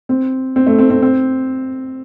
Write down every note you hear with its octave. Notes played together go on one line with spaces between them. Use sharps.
C4
C4
A3
C4
C4
C4